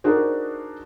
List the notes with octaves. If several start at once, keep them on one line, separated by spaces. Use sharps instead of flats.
D4 D#4 F#4 G#4 A#4 C5